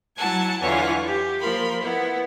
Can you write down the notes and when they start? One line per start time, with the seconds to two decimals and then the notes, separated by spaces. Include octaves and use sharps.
0.16 F#3 E4 F#5 G#5 A5 G#6
0.61 E2 D3 E3 F4 C#5 G#5
1.06 G4
1.40 F3 A#3 A#4 B5 C6
1.82 B3 E4